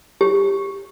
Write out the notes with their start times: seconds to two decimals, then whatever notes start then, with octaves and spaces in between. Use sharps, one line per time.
0.21 G4